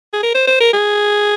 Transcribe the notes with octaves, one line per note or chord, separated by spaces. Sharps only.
G#4
A#4
C5
C5
A#4
G#4